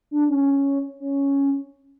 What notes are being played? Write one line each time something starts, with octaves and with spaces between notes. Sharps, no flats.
D4
C#4
C#4